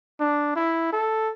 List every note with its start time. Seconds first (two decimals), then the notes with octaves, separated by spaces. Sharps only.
0.20 D4
0.56 E4
0.93 A4